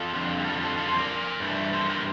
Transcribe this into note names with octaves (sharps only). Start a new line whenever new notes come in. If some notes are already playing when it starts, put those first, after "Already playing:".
Already playing: F4 A4
F2 D3 G3
G4
F4 A4
F4 A4
F4 A4
A4 C5
A#4 D5
G2 E3 A3
A4 C5
G4 A#4